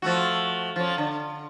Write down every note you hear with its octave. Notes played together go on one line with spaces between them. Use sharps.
F3 A3 F#4
F3 C#4
D3